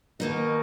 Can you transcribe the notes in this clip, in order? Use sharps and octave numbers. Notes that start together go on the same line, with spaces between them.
B2 D#3 A#3 D#4